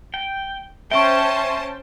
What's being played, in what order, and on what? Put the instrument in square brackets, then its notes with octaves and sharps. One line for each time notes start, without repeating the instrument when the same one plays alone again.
[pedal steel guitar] G5
[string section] C#4 C5 A5 [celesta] E5 C#6 [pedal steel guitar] G5